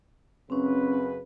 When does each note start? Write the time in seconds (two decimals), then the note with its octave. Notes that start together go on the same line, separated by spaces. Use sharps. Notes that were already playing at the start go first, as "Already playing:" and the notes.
0.50 F#2 C#3 C4 C#4 B4